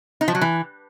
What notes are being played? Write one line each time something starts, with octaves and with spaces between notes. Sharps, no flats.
D#4
F3
F#3
E3